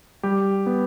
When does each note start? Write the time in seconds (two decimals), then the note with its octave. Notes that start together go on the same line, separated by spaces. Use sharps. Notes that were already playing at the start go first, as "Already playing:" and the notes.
0.23 G3 G4
0.66 B3